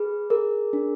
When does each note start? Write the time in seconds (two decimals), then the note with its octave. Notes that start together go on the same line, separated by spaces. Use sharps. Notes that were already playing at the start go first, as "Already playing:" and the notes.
Already playing: G#4 B4
0.30 G#4 A#4
0.73 D4